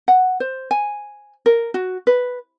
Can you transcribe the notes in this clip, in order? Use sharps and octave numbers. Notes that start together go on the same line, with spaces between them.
F#5
C5
G#5
A#4
F#4
B4